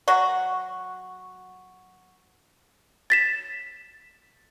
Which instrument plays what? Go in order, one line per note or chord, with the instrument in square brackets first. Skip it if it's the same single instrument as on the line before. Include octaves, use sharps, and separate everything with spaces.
[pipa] F#3 F#4
[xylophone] A6 B6 E7